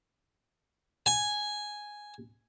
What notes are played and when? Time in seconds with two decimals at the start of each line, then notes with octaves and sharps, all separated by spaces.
1.06 G#5